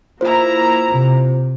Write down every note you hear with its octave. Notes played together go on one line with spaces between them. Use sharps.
A#3 E4 F4 C5 A#5
C3